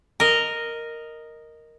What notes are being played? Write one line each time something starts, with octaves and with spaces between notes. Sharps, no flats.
A#4 D#5